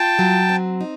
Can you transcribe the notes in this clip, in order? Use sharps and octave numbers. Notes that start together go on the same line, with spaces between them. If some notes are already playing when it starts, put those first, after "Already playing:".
Already playing: F4 G5 A5
F#3
C4
D#4